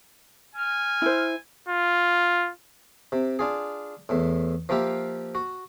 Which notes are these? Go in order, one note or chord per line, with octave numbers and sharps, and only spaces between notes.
G#5 F6
E4 C5
F4
C3
D4 F4 G#4
E2 A2
F3 A#3 F4 G4 E5
F#4